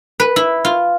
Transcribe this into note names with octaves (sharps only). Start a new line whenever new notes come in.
B4
E4
F4